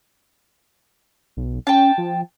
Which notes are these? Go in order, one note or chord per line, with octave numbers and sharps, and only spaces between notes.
B1
C#4 G5 A5
F3